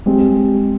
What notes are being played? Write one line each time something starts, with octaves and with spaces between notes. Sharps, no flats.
G#3 C4 G4